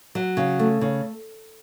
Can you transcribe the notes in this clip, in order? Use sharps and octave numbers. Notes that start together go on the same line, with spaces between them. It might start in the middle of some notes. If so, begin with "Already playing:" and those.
F#3
C#3
A3
C#3